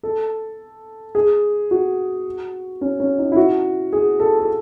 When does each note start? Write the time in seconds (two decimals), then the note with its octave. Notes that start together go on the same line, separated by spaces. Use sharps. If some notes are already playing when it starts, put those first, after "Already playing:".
0.03 A4
1.15 G#4
1.71 F#4
2.81 C#4
3.00 C#4
3.18 D#4
3.32 E4
3.36 F#4
3.93 G#4
4.20 A4
4.40 A4